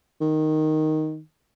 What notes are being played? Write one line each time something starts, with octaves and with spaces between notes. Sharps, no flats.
D#3